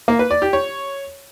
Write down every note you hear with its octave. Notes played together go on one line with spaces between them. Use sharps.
A#3
B4
D5
G4
C#5